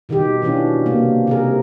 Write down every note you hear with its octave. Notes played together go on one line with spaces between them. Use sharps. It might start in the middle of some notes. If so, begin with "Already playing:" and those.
B2 D#3 D#4 G4
B2 E3 C#4 D4 F4
C3 A#3
C3 G#4 A#4